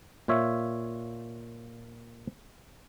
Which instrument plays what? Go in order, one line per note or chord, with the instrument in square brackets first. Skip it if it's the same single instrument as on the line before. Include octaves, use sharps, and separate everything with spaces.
[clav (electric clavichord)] A#2 F4 C#5 E5